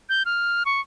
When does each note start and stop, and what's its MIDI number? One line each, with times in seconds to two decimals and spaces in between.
0.09 0.23 91
0.26 0.63 89
0.66 0.81 85